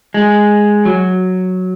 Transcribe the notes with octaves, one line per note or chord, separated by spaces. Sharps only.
G#3
F#3